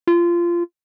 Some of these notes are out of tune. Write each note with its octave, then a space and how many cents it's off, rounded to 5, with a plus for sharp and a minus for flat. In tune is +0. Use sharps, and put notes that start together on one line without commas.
F4 -20